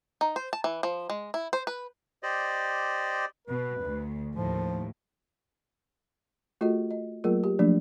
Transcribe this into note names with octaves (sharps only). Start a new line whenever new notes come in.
D#4
C5
A5
E3
F3
G#3
E4
C5
B4
G4 C5 D5 D#5
B2 B4
D2
D#2 A2 F3
A3 F4 F#4 G#4 A4 D#5
D#5
F#3 A3 A#3 F4 G#4 A#4
G4
F3 F#3 A3 A#3 D4